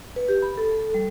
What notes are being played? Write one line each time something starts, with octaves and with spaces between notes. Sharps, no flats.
B4
G4
B5
A4
A4
G3